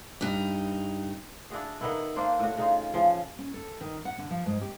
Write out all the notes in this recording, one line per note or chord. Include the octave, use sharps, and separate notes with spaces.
G2 D#4
D4 E4 F#4 G#4
D#3 B3 E4
A#3 D4 C5
A2 F#4
C#3 D#4 F4
C#3 E3 F3 C#4
C#4
A4
D#3
F#5
D3
F3
G#2
G4